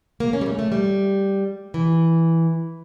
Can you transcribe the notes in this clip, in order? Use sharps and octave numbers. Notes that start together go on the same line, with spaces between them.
A#3
C#4
G3
A3
A3
G3
E3